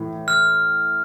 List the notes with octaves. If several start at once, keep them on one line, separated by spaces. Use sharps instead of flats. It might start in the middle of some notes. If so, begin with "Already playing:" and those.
Already playing: A2 E3 A3
F6